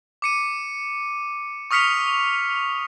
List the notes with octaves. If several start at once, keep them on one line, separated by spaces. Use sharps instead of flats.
D6 C#7 D#7
C#6 D#6 F6 B6 C#7 F7